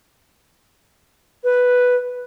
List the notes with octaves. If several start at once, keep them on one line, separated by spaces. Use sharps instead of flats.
B4